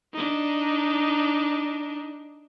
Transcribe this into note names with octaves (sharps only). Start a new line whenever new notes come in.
D4 D#4